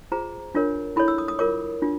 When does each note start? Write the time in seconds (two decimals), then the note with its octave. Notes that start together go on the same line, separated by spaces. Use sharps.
0.12 F4 G#4 C5 A#5
0.55 D4 F4 A#4 C#5
0.96 E4 A4 C#5 B5
1.08 E6
1.18 D#6
1.28 D#6
1.39 F4 A#4 C#5 D6
1.82 D4 F4